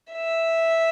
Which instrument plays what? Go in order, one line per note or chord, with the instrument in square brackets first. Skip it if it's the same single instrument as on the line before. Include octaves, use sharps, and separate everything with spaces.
[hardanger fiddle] E5